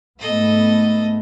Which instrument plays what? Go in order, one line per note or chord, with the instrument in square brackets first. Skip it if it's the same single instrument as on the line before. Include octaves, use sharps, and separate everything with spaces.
[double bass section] G#2 A3 B3 [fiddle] A4 D#5